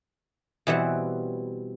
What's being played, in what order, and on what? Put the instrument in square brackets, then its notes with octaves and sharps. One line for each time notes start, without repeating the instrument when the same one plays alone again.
[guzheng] B2 E3 G3 C4 F#5